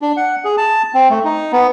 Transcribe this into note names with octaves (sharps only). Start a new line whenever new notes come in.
D4
F#5
G#4
A5
C4
A3
D#4
B3